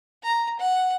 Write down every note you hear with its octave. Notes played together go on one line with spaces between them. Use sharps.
A#5
F#5